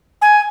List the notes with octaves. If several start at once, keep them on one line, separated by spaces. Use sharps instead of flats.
G#5